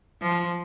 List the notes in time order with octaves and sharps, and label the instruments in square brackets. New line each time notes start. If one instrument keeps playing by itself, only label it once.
[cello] F3